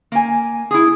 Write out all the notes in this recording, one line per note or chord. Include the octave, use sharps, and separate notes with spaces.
A#3 G#5
E4 G#4